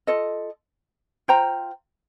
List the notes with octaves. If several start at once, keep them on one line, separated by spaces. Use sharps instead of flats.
F4 A4 D#5
F4 C5 G5 A#5